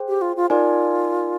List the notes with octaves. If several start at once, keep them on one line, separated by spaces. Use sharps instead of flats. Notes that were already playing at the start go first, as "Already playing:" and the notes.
Already playing: G#4 C5 G5
G4
F4
F4
D#4 F4 A#4 D5 G#5